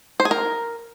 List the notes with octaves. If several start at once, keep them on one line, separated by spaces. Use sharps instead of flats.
C5
G#4
A#4